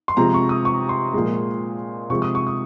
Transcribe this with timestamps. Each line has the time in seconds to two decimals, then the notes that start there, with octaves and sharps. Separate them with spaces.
0.08 C6
0.17 C3 F3 G#3 A#5
0.34 C#6
0.49 D#6
0.65 C#6
0.89 C6
1.13 A#2 F3 G#3
2.10 C3 F3 G#3 C#6
2.22 D#6
2.35 C#6
2.47 D#6